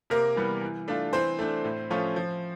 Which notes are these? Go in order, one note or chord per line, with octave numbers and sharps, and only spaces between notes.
C3 A#3 A#4
E3 G3 B3
E3
A3 D4 F4
E3 C4 C5
A3 D4
A2
F3 A3 C#4 F4
F3